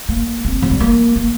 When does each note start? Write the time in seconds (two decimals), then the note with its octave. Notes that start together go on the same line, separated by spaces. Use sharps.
0.09 A#3
0.45 C4
0.62 F3
0.71 G3
0.80 A#3
1.16 A#3